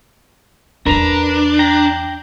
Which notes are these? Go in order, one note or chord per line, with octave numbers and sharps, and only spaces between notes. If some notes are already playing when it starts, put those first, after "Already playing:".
E2 C#4 D4 A#4 B4 A#5
G5 A#5